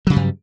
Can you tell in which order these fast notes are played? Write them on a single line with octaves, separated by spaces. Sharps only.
F#3 C#3 G3 G2